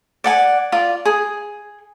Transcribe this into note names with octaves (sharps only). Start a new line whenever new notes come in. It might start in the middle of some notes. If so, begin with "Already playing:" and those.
D5 F#5 G#5
F4 D5
G#4